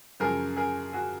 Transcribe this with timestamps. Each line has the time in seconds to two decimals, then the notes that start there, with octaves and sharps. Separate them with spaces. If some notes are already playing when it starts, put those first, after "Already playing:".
0.20 F#2 C#3 F3 G#4 A#4
0.56 G#4 A#4
0.93 F#4 G#4